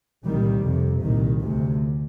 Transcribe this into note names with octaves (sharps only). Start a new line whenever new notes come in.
C2 A#2 D#3 G3
F2 C3
C2 A#2 D#3
D2 C3